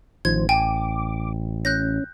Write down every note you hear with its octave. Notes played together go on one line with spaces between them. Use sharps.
A1 D#3 F3 C5 G#6
G5 G#5 D6
C#4 F#6 G6 A#6